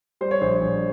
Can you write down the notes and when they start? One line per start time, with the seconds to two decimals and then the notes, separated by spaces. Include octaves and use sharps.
0.21 G3 C5
0.31 C#5
0.41 A#1 C5
0.61 A#1